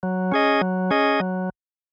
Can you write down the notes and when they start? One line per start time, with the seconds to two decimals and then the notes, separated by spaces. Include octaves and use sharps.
0.03 F#3
0.32 C#4 G#4 D#5
0.61 F#3
0.91 C#4 G#4 D#5
1.20 F#3